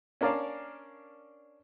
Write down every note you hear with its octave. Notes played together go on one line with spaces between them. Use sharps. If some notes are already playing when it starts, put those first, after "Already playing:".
C#4 D4 A#4 D5 F5 A5